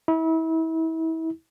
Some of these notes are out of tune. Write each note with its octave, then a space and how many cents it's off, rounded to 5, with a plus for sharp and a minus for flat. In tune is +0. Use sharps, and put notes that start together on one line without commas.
E4 -30